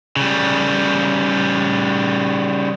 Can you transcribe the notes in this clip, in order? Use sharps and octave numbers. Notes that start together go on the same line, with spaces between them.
C#3 G3